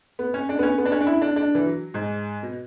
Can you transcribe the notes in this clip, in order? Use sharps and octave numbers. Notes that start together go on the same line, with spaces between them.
B3
C#4
D4
B3
C#4
B3
D4
C#4
D4
E4
D4
D4
E3
F#3
G#2
B2